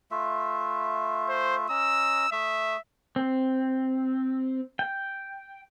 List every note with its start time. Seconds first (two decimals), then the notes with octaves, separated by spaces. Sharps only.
0.11 A3 F4 E5
1.29 C5
1.70 C#4 D#5 A#5 E6
2.32 A3 E5 D#6
3.16 C4
4.79 G5